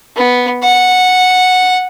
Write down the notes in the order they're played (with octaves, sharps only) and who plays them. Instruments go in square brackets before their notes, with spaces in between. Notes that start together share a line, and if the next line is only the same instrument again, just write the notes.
[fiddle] B3
F#5